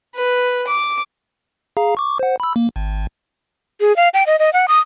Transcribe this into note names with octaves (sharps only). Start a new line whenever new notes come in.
B4
D6
G#4 F5 A#5
C#6 D6
C5 F#5
B5 E6
A#3
G#1
G#4
F5
G5
D#5
D#5
F#5
D#6